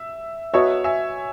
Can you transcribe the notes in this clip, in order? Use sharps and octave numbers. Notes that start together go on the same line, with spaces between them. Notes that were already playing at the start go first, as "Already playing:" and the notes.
Already playing: E5
F#4 B4 C#5 D#5 E5 A5 C#6
E5 G#5